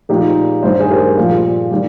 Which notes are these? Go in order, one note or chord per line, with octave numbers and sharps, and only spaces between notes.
A#2 F3 G#3 D#4 G4
G2 D#3 G#3 C5
G#4 C5
G4 A#4
A#2 F3 G#3
D#3 G3